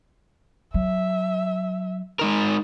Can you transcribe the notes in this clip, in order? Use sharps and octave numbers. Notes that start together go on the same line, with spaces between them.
F#3 E5
G#3 D#4 A#4